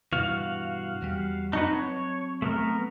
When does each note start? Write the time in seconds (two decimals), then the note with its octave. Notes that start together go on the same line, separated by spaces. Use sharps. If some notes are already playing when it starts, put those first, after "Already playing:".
0.13 G2 B2 E3 F#4 F5
1.02 E2 G3
1.53 F#3 C4 D#4 F#4 B4 A5
1.73 C#5
2.42 A3 B3 A#4